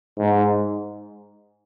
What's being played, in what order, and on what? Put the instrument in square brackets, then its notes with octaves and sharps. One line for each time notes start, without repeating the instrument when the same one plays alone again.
[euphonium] G#2